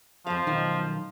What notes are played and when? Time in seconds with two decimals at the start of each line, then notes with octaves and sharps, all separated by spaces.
0.27 F2 F3 F5
0.47 B1 D#3 D#4